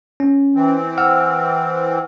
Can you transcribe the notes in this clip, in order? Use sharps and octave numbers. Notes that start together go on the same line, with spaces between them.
C#4
E3 C4
F#5 E6 F6